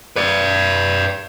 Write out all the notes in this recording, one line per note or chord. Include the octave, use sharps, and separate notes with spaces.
B4 D5